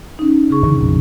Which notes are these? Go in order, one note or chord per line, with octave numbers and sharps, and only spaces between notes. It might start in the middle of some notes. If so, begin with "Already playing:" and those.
C#4 D#4
C#3 G#4 C#6
D3 E3 C#4
A#1 F2 B2